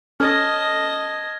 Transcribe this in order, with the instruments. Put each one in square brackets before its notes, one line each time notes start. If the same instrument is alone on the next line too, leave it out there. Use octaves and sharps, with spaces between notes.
[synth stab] C#4 A4 [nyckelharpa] D#5 A5 [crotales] F6 G#6 A#6